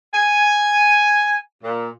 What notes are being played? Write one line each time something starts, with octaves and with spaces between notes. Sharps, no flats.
G#5
A#2